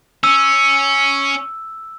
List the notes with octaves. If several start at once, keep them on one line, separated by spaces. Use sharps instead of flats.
C#4 E6